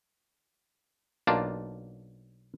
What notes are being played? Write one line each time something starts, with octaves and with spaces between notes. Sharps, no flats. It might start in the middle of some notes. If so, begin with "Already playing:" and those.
B1 A#3 D4 F4 A5